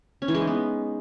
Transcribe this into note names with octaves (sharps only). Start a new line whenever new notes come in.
C#4
E3
G#3
D#4
B3